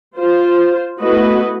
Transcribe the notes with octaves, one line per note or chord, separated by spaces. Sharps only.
F4 C5
A3 B3 E4 F#4 B4 D#5